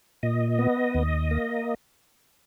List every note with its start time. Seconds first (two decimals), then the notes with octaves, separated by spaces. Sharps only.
0.23 A#2 D#5
0.59 B3
0.95 D#2
1.31 A#3